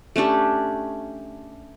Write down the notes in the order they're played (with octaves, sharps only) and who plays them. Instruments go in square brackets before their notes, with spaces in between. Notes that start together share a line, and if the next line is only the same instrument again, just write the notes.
[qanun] A3 C#4 D4 G4